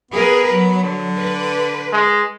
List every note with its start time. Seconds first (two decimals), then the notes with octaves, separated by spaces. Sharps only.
0.11 B3 G#4 A#4 B4
0.51 F#3
0.83 D3
1.19 B4
1.93 G#3